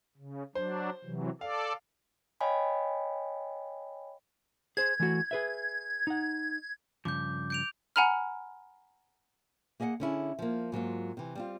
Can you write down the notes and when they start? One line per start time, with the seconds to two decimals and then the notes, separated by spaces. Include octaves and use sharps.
0.17 C#3
0.55 F#3 D4 C5
1.04 C3 E3 F#3
1.41 A4 D5 F5
2.41 C#5 D#5 F5 G5 G#5 B5
4.77 G#4 C5 G#6
5.00 E3 A3 F#4
5.31 G#4 B4 E5
6.07 D#4 F#5
7.05 G2 C#3 F3 D6 G6
7.50 G6 D7 F7
7.96 F#5 G#5 A#5 B5 F6
9.80 A#3 G#4 D#5 F5 F#5
10.00 D3 C#4 E4 G#4
10.39 F3 A#3
10.72 G#2 F#3 A#3 F4
11.17 C3 E3
11.35 G3 C4 F4